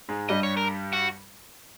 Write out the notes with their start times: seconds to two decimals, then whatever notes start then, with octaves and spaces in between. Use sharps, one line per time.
0.09 G#2 G#3
0.29 G2 G3 D#5
0.43 C#5
0.57 A#4
0.93 F#4